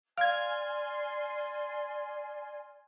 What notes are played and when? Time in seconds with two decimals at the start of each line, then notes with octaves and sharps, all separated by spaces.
0.17 D5 F5 G#5 C6 F6 G#6